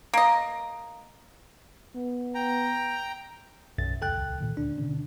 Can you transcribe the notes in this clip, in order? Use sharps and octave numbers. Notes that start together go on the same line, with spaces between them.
A#3 D#5
B3
G5 A#5
B1 F#2 A6
D#1 C#2 A4 G5 F#6
A#2 D#3
D2 D4
B2 D3 C#4